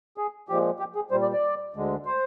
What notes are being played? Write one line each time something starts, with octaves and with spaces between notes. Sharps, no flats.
G#4
A#2 F3 G#3 G4
G4
G#4
A#2 G3 C5
D5
D5
D2 D3 G#3
C5